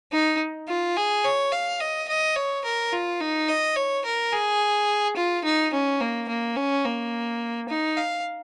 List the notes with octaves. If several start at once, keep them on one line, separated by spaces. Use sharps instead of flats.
D#4
F4
G#4
C#5
F5
D#5
D#5
C#5
A#4
F4
D#4
D#5
C#5
A#4
G#4
F4
D#4
C#4
A#3
A#3
C#4
A#3
D#4
F5